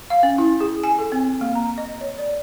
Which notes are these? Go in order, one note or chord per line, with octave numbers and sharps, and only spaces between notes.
F5
C#4
E4
G#4
G#5
A4
C4
A#3
A#5
D#5
C#5
D5